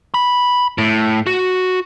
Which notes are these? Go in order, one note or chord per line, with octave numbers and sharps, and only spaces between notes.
B5
A2
F#4